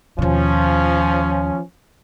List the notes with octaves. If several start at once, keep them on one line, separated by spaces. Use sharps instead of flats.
D#2 B2 F3 C#4